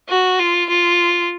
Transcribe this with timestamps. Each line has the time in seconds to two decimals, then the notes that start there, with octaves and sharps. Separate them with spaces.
0.09 F#4
0.39 F4
0.70 F4